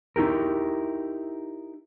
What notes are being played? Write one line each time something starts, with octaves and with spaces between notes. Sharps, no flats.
D#4 E4 G4 A#4